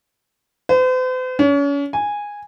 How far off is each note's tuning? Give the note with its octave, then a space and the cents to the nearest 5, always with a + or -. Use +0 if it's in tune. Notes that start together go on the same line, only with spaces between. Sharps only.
C5 -45
C#4 +35
G#5 -10